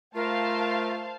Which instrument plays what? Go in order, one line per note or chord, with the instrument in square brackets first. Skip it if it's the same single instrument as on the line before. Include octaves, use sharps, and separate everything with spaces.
[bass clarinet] A3 [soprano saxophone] F4 [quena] A#4 [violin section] C5 F5 A5